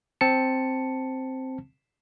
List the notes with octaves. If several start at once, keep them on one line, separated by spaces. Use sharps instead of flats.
C4 A5 C#7